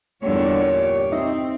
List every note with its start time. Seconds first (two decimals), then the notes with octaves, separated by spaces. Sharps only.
0.22 E2 G2 A#2 D3 G4 C#5
1.12 C4 D#4 D#5 E5